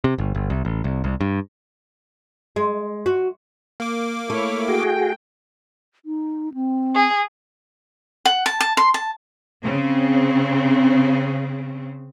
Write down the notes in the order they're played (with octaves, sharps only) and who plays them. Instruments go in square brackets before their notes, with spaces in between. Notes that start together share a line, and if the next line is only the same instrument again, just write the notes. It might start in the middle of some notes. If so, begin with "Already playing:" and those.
[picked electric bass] C3
G1
G1
C2
A1
C2
C2
G2
[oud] G#3
F#4
[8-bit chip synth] A#3 D6
[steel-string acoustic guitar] A3 [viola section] E4 C#5
[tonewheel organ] F#4 G#4 [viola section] G5
[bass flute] D#4
C4
[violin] G#4
[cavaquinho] F#5
A5
A5
C6
A5
[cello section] C#3 C4